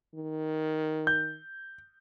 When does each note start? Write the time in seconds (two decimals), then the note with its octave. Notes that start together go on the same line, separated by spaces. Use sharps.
0.15 D#3
1.07 G6